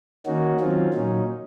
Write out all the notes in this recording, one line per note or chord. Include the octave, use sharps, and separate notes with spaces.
D#3 A#3 C#4 D#4 F#4
D#3 F#3 C4 C#4 F4
A#2 F#3 C#4 D#4